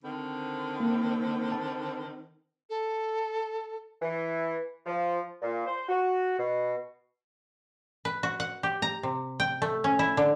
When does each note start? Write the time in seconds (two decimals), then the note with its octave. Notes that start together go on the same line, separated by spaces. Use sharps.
0.03 D3 D#3 C4
0.80 A#3
1.52 A5
2.70 A4
4.01 E3
4.86 F3
5.41 A#2
5.65 C5
5.88 F#4
6.37 B2
8.05 B4
8.23 F#4
8.40 F#5
8.63 G4
8.82 A#5
9.03 C3
9.40 G5
9.62 A3
9.84 C#4
9.99 E4
10.17 D3